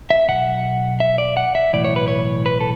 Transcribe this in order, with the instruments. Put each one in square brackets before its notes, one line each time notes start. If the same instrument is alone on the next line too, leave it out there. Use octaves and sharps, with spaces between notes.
[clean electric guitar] E5
B1 B2 F#5
E5
D5
F#5
E5
B1 A2 E3 D5
C#5
B4
C#5
B4
A4